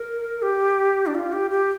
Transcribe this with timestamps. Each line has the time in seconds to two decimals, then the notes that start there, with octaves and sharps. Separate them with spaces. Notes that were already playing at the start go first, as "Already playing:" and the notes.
Already playing: A#4
0.42 G4
1.06 D4
1.15 F4
1.32 G4
1.51 G4